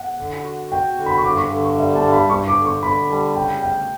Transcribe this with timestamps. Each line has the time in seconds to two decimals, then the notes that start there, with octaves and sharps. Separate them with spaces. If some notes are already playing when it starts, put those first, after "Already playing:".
Already playing: F#5
0.19 D3
0.44 F#4
0.71 F#4 G5
0.97 D3
1.06 B5
1.17 C#6
1.24 G2 D6
1.37 C#6
1.50 D3
1.64 C#6
1.77 G3 E5
1.95 A5
2.04 G2
2.12 B5
2.30 G2 C#6
2.48 D6
2.57 D3
2.65 C#6
2.83 D3 B5
3.10 G3 A5
3.36 C#3 G5
3.62 D2 G5